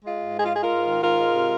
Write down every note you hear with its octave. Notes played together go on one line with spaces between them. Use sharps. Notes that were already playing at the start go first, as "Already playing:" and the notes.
G#3 F4
G#2
G#3 G#4
F4
G#3 G#4
F4 A#4
G#2
D#3
G#2 F4 A#4
G#3
C3